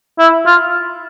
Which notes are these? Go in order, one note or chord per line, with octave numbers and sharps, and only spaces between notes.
E4
F4